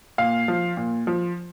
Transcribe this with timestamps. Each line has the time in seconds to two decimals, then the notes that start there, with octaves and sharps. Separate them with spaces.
0.18 A#2 F5
0.48 F3
0.77 A#2
1.07 F3